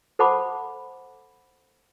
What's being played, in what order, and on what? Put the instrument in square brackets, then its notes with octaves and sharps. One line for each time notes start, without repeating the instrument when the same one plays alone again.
[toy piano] A4 C5 F#5 A5 B5 D6